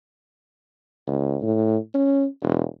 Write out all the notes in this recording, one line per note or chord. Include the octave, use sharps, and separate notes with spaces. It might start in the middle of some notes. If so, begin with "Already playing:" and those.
C#2
A2
C#4
E1